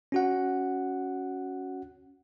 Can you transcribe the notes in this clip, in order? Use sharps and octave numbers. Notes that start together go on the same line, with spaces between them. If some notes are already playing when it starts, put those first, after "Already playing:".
C#4 F#4 F#5